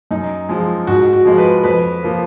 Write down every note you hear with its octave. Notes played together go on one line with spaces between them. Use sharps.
F#2 D#4
F3 G#3
G#2 F#4
F#4
F3 G#3
B4
F2 B4
F3 A#3